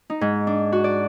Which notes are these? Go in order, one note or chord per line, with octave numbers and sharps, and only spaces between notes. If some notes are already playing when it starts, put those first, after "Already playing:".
D#4
G#2
D4
F#4
D5